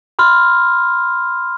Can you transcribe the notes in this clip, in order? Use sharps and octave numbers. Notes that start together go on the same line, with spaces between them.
B5 C6 F6